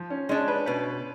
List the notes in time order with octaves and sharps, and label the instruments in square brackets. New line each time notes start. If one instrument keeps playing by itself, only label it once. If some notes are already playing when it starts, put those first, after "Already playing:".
Already playing: [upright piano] F3
C#4
[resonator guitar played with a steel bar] G#3 D4 [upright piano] C#4
[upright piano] B4
[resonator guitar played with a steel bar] B2 [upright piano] B4